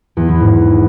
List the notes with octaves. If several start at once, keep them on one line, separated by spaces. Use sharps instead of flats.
E2
E3
G#2